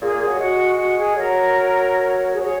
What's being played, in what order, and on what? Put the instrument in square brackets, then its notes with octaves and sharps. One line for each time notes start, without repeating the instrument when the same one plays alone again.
[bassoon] A#2 [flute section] G#4
[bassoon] A#2
[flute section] G#4
[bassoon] F#3
[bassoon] G#3 [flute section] F#4
[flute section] F#4
G#4
[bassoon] F#3 [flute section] A#4
[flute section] G#4 C#5
G#4 C#5